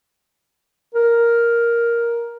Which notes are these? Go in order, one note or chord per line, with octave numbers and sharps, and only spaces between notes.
A#4